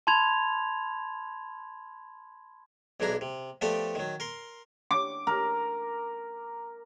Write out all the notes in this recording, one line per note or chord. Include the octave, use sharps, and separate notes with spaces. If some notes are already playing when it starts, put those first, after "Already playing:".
A5 B5 C6 G#6 F7
B1 E3 G#3 D4 A#5
C3
F3 A3 B3 G4 A4 D5
D#3 F#3
A#4 C6
D6
A#4